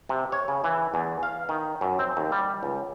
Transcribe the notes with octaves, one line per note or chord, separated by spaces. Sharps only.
C3
C#5
C#3
E3
E2
F5
D#3
F#2
C4
D#2
G3
C#2